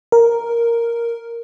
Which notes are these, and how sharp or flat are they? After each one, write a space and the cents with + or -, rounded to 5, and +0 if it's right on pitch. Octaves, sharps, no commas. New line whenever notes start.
A#4 +0